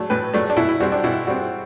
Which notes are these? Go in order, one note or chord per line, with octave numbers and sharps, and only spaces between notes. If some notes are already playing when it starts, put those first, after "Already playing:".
Already playing: F#3 A3 D4
A2 B4
F#3 A3 D4
D4
B2 E4
E4
G3 C4 F#4
D4
B2 E4
G3 C4 F#4